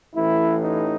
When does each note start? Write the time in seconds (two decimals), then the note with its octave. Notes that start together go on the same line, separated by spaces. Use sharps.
0.14 A1 A2 E3 E4
0.62 D#4